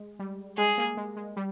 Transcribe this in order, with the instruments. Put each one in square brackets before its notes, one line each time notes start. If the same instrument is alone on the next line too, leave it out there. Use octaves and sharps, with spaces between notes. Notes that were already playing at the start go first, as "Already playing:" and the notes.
Already playing: [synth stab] G#3
G3
[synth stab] G#3 [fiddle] G#4
[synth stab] A#3
G#3
G#3
G3